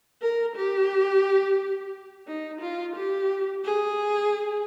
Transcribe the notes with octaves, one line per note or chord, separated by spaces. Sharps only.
A#4
G4
D#4
F4
G4
G#4